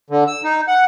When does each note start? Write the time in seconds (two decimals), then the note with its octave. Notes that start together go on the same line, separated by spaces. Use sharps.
0.10 D3
0.28 E6
0.44 D#4
0.68 F#5